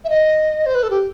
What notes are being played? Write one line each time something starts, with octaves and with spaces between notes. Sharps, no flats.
E5
D#5
C5
B4
A4
G4